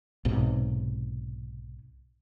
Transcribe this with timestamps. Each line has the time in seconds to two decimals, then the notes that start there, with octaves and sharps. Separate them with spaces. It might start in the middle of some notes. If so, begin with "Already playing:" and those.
0.25 B1 G#2 C3